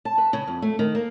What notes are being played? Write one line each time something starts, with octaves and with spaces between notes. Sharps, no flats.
A5
B4
C#3
F2
A3
D#3
A#3